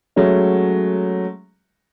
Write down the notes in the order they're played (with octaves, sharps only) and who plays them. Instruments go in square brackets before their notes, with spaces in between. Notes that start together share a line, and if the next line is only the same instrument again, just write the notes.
[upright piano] F#3 G#3 A3 C#4